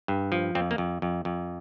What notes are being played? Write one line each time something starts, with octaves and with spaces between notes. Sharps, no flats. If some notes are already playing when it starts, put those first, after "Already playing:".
G2
F3
F2 C4
A#3
F2
F2
F2